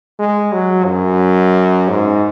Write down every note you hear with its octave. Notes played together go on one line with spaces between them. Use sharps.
G#3
F#3
F#2
G#2